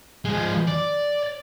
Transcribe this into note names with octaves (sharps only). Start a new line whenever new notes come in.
F3 G#3
D5